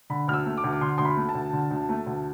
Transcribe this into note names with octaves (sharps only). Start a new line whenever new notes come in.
D3 B5
D2 F6
E6
A3
D6
D2
D6
D3 C6
D2 C6
B5
A3
A5
D2
D3
D2
A3
D2